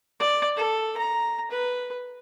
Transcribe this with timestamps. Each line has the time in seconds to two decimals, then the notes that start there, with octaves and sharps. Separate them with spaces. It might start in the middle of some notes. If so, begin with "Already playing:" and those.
0.20 D5
0.57 A4
0.98 A#5
1.51 B4